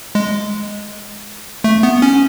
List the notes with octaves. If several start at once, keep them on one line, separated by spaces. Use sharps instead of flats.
G#3
A3
B3
C#4